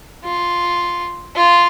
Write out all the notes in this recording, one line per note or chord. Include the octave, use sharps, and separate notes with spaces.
F4
F4